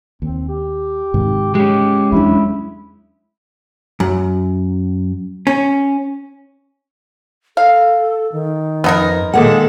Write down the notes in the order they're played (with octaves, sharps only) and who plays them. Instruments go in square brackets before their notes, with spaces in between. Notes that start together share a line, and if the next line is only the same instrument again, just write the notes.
[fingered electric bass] D#2 [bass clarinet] C4
[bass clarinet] G4
[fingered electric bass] G#2 C3 D#3
[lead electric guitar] G#3 C#4 [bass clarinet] G4
[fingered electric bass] E2 F#3 D4 [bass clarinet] E4
[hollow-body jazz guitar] F#2
C#4
[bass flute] A4 [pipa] F5
[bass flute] D#3
[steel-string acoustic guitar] F2 [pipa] B3 D#4 A#4
[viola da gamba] A#2 D#3 A4 [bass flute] G#3 [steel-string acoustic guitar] A#3 F#5